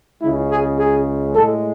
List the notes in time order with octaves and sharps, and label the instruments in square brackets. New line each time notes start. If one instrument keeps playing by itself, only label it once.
[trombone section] C#2 C#3 G#3 E4
G#4
G#4
A2 G#3 A4